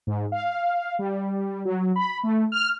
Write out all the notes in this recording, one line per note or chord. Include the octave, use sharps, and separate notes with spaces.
G#2
F5
G3
F#3
B5
A3
F6